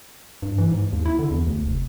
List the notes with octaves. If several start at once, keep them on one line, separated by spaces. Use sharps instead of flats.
G2
E3
G#2
D#2
E4
D3
E2
D2
F1